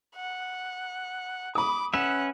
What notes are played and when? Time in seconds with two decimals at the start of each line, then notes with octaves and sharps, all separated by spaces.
0.16 F#5
1.55 B5 D6 D#6
1.94 C#4 B4 E5 F#5 E7